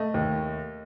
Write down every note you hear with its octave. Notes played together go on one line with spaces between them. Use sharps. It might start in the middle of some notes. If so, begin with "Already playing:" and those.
Already playing: A3 D#5
D#2